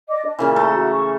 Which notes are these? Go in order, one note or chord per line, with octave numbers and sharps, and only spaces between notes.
D5 D#5 D6
D4 D#5
A#2 C#3 E3 A#4
A3
F#4
C#6